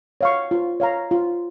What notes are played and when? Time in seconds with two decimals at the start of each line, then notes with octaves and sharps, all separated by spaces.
0.21 C#5 F5 C#6
0.51 F4
0.80 C#5 F5 A#5
1.11 F4